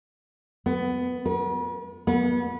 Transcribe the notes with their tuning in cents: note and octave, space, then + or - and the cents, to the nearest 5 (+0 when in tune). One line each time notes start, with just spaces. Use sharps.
B3 +15
B4 -45
B3 -30